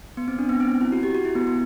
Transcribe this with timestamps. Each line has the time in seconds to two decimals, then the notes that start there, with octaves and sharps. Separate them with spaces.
0.17 B3
0.28 C4
0.39 D4
0.49 B3
0.60 C4
0.81 E4
0.92 F#4
1.03 G4
1.15 F#4
1.25 E4
1.35 B3
1.47 B3